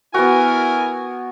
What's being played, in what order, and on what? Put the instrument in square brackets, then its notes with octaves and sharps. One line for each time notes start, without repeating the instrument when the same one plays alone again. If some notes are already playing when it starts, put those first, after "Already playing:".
[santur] B3 F#4 [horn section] E4 A#4 G#5